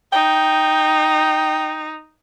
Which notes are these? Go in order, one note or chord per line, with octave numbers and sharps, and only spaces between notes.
D#4 G5